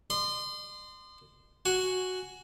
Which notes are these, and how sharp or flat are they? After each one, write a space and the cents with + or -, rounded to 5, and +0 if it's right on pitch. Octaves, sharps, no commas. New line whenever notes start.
D#5 -45 C6 -20
F#4 +0 G#5 +0